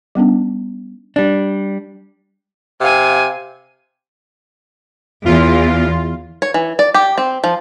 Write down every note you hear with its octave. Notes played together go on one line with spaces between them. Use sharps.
G3 B3 C#4 D4
G3 D4
C3 F5 G#5
E2 F4
C#5
E3
D5
G4
C4
F3